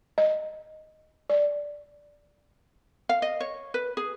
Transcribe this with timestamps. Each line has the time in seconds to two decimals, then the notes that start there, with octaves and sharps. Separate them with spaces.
0.18 D#5
1.30 D5
3.09 F5
3.22 D#5
3.40 C#5
3.74 B4
3.97 G#4